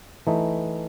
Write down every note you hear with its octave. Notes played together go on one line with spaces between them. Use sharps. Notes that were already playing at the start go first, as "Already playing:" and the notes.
E3 A3 D#4